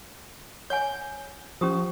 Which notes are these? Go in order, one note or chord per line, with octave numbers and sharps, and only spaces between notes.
C#5 F#5 G#5 G6
F3 C#4 G4 D#6